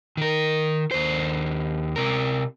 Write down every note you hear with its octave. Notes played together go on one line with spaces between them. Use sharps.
D#3 A#4
D#2 C5
C3 A#4